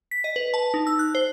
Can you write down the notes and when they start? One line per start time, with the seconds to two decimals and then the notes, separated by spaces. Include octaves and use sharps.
0.11 B6
0.24 D#5
0.36 B4
0.54 A5
0.74 D#4
0.87 E6
0.99 F#6
1.15 C5